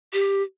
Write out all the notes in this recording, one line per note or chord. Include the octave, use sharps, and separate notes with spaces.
G4